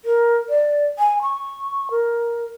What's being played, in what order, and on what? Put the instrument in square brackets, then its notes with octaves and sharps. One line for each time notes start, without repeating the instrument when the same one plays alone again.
[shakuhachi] A#4
D5
G#5
C#6
A#4